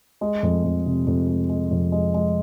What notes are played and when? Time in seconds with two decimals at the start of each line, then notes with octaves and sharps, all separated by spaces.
0.21 G#3
0.43 F2
0.64 F2
0.86 C3
1.07 F2
1.28 G#3
1.49 G#3
1.71 F2
1.92 G#3
2.14 G#3